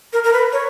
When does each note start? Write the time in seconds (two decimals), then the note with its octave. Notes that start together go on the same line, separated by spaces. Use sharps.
0.13 A#4
0.24 A#4
0.33 B4
0.53 C#5